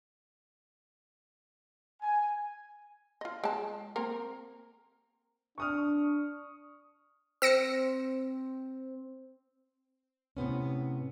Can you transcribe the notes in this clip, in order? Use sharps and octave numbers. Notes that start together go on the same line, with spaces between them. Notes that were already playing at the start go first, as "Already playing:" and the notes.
G#5
F4 D#5
G#3 A5
A#3 C4 A#4
D4 C#6 D#6 F6
C4 E6 A#6 C#7
A2 C3 B3 C#4